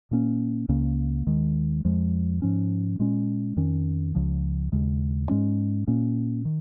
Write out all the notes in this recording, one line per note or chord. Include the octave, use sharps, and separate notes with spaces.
A#2 A#3 C#4
C#2 C#3 A#3 C#4
D#2 D#3 G#3
F2 F3 G#3
G#2 F3 C#4
A#2 G#3 C#4
F2 D#3 C#4
C#2 C#3 F3
D#2 C#3 G#3
G#2 G#3 C#4
A#2 A#3 C#4
D#3